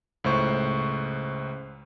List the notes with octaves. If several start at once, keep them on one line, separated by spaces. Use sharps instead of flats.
C#2 A2 C5 C#6